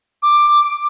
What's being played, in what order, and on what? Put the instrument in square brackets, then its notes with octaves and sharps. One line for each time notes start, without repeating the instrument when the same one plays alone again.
[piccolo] D6